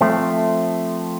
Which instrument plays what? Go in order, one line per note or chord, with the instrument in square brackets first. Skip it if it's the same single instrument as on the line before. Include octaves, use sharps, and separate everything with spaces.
[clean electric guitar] F3 A3 C4